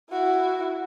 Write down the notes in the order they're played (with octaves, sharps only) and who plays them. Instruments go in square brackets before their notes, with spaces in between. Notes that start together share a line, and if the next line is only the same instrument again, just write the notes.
[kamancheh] E4 F#4